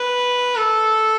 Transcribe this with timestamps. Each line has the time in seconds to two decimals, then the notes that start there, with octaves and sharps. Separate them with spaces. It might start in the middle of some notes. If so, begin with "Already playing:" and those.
Already playing: B4
0.56 A4